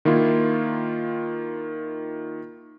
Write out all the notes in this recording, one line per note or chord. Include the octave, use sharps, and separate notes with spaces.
D#3 A#3 E4 F4